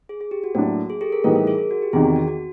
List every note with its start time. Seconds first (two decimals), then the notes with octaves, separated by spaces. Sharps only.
0.09 G#4
0.21 G#4
0.31 G4
0.44 F#4
0.55 A2 F#3 A#3 D4 F#4
0.90 G#4
1.01 G4 A4
1.12 G#4 A#4
1.24 A2 E3 G3 B3 D#4 G#4 A#4
1.36 G#4 A#4
1.47 G#4 A#4
1.58 G#4
1.71 F#4
1.82 G4
1.93 E2 C3 D#3 G#4
2.05 F#4
2.16 F#4
2.28 F#4